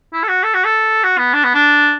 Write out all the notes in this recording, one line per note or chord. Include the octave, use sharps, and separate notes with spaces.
E4
A4
F#4
A4
F#4
A4
F#4
B3
D4
B3
D4